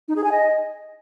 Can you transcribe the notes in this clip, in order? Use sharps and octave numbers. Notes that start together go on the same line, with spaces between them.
D#4
G#4
G#5
D#5